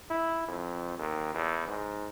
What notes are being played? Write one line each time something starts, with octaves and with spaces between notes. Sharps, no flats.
E4
F2
D#2
E2
G#2